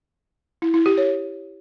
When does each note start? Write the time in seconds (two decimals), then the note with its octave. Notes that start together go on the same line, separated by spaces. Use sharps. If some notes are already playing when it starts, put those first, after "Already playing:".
0.62 E4
0.74 E4
0.86 G4
0.98 C#5